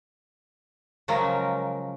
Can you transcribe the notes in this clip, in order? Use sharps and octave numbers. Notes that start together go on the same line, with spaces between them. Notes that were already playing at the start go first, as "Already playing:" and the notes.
C#3 F3 F#3 G#3 C#4 A#4